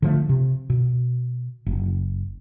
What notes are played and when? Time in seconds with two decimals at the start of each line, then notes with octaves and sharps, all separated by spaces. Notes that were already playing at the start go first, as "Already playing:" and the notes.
0.02 D3 F3 A3
0.29 C3
0.70 B2
1.66 F#1